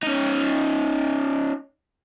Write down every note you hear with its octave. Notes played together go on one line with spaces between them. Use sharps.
C#4 D#4